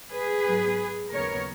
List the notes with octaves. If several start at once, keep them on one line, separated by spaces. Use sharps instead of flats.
G#4 B4
G#2 F#3 B3
D#2 C#3 F#3 B3 A#4 C#5